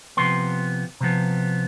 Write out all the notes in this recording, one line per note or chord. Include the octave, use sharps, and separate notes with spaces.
C3 F3 B3 C6
C3 F3 B3